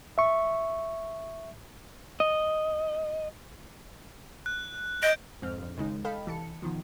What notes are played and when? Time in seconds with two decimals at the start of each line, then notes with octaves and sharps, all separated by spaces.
0.18 E5 C#6
2.20 D#5
4.46 F#6
5.03 D#5 G6 D7
5.42 F2 G#2 C4 F6
5.58 A#1 F2
5.77 D#2 C#3 G#3 D#4
6.05 A4 D#5 F5 G5 B5
6.26 C2 E3 A5 C#7
6.62 B2 D#3 F3